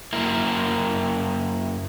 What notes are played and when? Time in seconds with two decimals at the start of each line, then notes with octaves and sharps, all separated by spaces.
0.13 F#2 A#3 E4 A#4